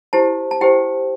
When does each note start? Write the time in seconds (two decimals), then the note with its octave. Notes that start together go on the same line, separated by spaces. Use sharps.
0.13 E4 G4 C5 A5
0.51 A5
0.61 E4 G4 C5 G5